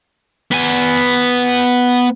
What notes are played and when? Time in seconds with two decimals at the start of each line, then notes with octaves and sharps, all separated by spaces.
0.51 B3 G#5